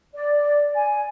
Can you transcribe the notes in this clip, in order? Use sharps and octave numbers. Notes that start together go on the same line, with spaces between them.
D5
G#5